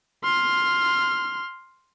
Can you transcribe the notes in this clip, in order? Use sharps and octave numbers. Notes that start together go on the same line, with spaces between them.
C6 F6